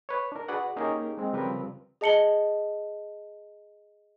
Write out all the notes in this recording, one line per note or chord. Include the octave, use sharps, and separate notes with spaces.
B4 C#5
D4 A#4
F#4 G#4 B4 D5 F#5
A#3 C#4 D#4 G4 G#4 A#4
G#3 C4
C#3 F3 G3 C4 A#4 B4
G#4 D#5 A5 C#7 F#7 G7